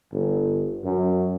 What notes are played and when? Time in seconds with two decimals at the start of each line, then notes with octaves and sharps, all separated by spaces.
0.12 G1
0.84 F#2